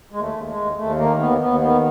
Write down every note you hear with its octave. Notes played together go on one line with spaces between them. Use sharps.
D#2 G#3
A3
D#2
G#3
D#2
D#2 A3
D#3 A#3
D#2 B3
D#2 B3
D#3 B3